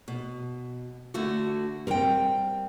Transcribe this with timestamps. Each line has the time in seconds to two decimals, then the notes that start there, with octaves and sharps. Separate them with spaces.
0.08 B2
1.14 D3 A3 F#4
1.87 G3 C4 A#4 F#5 G5